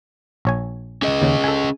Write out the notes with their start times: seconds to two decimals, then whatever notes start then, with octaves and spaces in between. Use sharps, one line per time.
0.45 A#1 C#5 G#5
1.02 C#4 G#4 D#5
1.22 D#2 C#3
1.44 A4 G#5